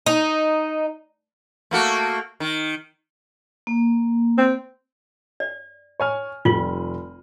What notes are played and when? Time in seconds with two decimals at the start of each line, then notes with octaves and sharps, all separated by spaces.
0.06 D#4
1.71 A3 A#3 F#4
2.40 D#3
3.67 A#3
4.38 C4
5.40 D5
6.00 C#5 G#5 F6
6.45 F1 G3 F4 F#7